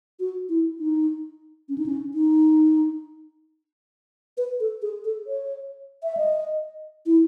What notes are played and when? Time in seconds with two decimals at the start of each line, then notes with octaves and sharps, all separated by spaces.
0.20 F#4
0.49 E4
0.80 D#4
1.69 C#4
1.78 D#4
1.86 C#4
2.14 D#4
4.38 B4
4.60 A4
4.82 G#4
5.04 A4
5.27 C#5
6.03 E5
6.17 D#5
7.06 E4